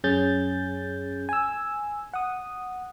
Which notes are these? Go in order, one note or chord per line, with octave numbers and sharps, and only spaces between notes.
F#2 C#4 G#4 G6 A6
G#5 E6
F#5 D#6